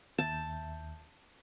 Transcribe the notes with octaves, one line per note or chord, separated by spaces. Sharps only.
D#2 E5 A5 G6